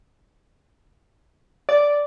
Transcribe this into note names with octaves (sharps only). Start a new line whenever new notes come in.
D5